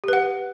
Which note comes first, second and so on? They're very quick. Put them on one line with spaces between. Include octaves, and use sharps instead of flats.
G4 B4 F#5